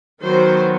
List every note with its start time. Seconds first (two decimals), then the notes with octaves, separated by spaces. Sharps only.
0.23 D#3 F#3 B3 C5